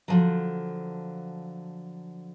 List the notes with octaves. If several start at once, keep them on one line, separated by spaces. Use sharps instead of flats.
D3 F3 F#3